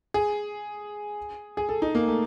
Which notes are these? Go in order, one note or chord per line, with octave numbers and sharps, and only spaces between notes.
G#4
G#4
A4
D#4
A#3
A3